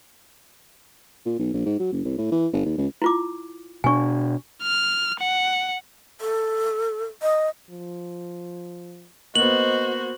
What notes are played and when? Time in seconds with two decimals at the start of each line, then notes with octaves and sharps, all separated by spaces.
1.25 A#2
1.39 B1
1.54 A#1
1.65 G#2
1.79 F#3
1.92 F#1
2.05 C2
2.18 A2
2.32 E3
2.53 G1
2.65 D#2
2.78 C#2
3.02 E4 F4 D6
3.84 B2 C4 D4 G#5 C#6
4.63 F6
5.19 F#5
6.21 A4
7.22 D#5
7.70 F3
9.35 A#3 B3 F#4 C5 D#5 F#7